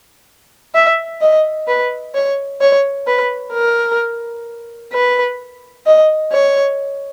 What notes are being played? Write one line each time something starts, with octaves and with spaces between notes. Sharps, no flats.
E5
D#5
B4
C#5
C#5
B4
A#4
B4
D#5
C#5